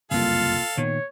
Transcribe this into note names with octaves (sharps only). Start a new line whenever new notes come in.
F#1 C2 F2 G3 A#3 F4 A4 F5
A#2 D#3 B3 C#5